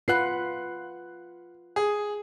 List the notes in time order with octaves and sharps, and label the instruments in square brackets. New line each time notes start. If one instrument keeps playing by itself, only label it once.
[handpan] F4 B4 F#5 [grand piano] F#6 C7
[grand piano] G#4